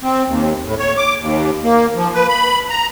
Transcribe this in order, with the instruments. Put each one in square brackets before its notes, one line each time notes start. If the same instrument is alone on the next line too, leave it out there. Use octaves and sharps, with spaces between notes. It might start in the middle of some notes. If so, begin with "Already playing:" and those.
[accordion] C4
D#2
A2
C#5
D6
D#2
A#3
F3
B4
B5
A#5